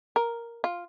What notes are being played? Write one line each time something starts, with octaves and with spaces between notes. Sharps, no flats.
A#4
F4